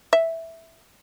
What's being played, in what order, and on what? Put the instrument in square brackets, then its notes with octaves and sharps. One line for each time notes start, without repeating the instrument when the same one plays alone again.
[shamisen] E5